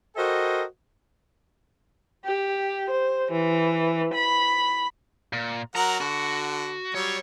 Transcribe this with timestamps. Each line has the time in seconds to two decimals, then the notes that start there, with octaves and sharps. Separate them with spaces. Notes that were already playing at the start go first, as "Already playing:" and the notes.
0.16 F#4 A4 A#4 C5 D#5 G5
2.25 G4
2.90 C5
3.31 E3
4.14 B5
5.33 A#2
5.75 F#3 A#4 F#5 A#5
6.01 D3 F#4
6.95 F#3 G3 C#5